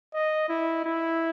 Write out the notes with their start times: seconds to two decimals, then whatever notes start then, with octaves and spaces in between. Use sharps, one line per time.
0.14 D#5
0.49 E4
0.84 E4